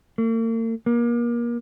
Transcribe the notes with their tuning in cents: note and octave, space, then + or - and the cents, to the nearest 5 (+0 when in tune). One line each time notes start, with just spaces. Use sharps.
A#3 -45
A#3 +30